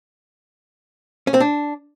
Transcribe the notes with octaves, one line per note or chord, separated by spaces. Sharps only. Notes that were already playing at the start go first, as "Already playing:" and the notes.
C#4
C4
D4